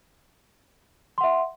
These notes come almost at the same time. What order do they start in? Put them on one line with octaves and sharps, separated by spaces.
C6 F#5 E5